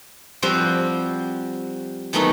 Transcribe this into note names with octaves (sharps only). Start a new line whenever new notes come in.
F3 G3 C4 F#4 C5
D#3 E3 F#3 A3 B3 D#4